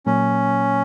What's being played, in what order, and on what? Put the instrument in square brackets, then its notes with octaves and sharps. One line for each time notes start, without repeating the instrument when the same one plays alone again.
[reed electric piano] A#2 F#3 A#3 [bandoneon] C#4